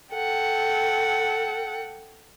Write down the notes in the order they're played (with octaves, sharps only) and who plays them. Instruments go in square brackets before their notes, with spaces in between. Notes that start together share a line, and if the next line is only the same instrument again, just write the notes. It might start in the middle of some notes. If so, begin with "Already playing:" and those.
[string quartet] A4 F#5 G5